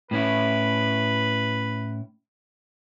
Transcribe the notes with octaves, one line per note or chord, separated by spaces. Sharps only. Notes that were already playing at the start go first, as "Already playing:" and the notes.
A2 C#4 E4 B4